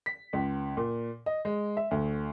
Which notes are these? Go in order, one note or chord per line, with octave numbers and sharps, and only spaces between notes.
B6
C#2
A#2
D#5
G#3
E5
D2